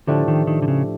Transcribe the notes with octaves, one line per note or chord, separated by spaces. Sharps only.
A2 D3 F3 A3 D4 G4
D#3
D#3
D3
C#3